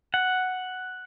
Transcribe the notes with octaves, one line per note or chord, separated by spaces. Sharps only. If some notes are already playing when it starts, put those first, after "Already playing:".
F#5